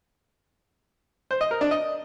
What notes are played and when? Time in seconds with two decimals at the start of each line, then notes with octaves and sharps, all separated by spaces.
1.31 C5
1.41 D#5
1.51 A#4
1.61 D4
1.71 D#5